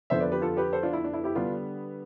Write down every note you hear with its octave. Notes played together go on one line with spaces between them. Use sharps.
F2 D3 F3 B3 C5 E5
B4 D5
G4 B4
F4 A4
G4 B4
A4 C5
D4 F4
E4
D4
E4
E4 G4
D3 G3 B3 D4 F4